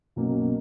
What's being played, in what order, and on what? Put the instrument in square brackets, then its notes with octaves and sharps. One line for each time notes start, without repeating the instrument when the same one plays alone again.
[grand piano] B1 B2 F#3 A#3 C#4